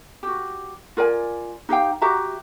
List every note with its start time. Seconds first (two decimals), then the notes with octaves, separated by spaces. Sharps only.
0.23 F#4 G4
0.97 F4 A#4 D5 G#5
1.69 D#4 G4 F5 G5
2.01 F#4 G4 E5 A#5